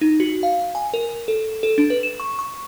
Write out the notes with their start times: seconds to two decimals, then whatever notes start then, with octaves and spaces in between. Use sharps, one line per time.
0.01 D#4
0.20 F#4
0.43 F5
0.75 G#5
0.94 A#4
1.28 A4
1.63 A4
1.78 D4
1.90 B4
2.03 E7
2.20 C#6
2.39 C#6